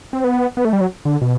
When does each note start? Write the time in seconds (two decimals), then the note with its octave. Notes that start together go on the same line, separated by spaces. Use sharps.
0.13 C4
0.24 B3
0.57 B3
0.65 A3
0.73 G3
0.81 F#3
1.05 D3
1.22 B2